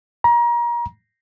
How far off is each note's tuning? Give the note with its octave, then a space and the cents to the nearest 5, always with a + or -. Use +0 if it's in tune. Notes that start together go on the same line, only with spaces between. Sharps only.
A#5 +30